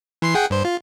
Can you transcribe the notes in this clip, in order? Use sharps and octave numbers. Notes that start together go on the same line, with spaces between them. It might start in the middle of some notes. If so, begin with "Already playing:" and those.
E3 C6 C7
G#4 F#5 G5
G2 C5
F4